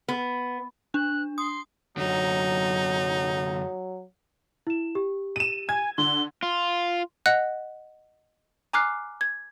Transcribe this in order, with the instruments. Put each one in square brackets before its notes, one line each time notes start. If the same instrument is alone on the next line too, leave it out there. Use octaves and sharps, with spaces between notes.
[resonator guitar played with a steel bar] B3
[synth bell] D4 [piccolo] F#6
[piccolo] C6 [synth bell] D#6
[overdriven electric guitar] F#2 D3 [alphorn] F#3 [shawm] D#4
[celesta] E4 E7
G4
[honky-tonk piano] D#7 E7
[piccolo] G#5 [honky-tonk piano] G#6
[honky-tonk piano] D3 [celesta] C6 [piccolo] G7
[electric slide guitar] F4
[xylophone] D#5 F#5 F#6
G#5 A#5 D6 F6 F#6 C7
G#6